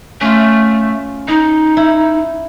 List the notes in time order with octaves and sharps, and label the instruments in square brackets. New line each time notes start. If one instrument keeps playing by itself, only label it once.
[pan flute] A3 [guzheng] C#4 F4
[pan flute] D#4 [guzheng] D#5
[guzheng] E4